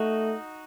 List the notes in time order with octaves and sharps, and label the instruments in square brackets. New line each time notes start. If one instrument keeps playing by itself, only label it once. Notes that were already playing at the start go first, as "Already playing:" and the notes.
Already playing: [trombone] A3 [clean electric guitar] D#4 F#4